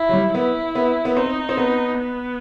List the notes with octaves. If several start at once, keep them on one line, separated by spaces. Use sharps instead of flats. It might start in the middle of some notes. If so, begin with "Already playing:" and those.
Already playing: E4
F#3
G3
B3 E4
B3
B3
C4 D#4
C4
B3
B3